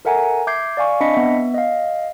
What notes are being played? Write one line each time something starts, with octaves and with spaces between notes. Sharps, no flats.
A4 A#4 E5 F#5 G#5 A#5
E5 D6 G6 G#6 C7
D5 F5 G#5 C#6
C4 D4 D#5 B5 B6 C#7
B3 E5
D#5 F5